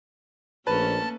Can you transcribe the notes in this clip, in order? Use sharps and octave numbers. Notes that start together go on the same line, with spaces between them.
A#1 A3 A#3 C#4 B4 A5